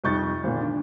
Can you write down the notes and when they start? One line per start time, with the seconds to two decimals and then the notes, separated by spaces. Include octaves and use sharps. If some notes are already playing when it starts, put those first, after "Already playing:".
0.04 C2 F2 D#4 C#6 G6 A6
0.44 G#1 A#2
0.60 D4